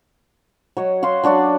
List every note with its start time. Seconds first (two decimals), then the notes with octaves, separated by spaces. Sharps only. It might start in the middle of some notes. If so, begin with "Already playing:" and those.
0.77 F#3 C#5 D#5
1.03 F#4 F5 F#5 C6
1.24 F#3 D4 F#4 D5